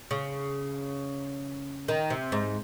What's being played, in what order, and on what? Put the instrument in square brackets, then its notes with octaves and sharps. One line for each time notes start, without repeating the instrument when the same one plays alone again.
[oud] C#3
D#3
C3
G#2